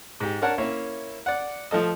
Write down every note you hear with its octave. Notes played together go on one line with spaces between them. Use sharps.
G#2 G4
D4 A#4 C#5 F#5 A5
A#3 C#4 E4 C#5 E5
D5 F#5
F3 A3 A4 D#5